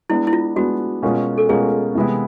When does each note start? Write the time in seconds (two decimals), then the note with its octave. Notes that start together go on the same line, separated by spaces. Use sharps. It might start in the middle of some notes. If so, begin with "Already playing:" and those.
0.10 G#3 B3 D4 E4
0.27 E4
0.33 F4
0.56 G#3 B3 D4 F#4
1.02 B2 G#3 C#4 F4 A#4
1.38 A4
1.49 B2 G#3 C#4 F4 G#4 A#4
1.95 C3 E3 G#3 B3 E4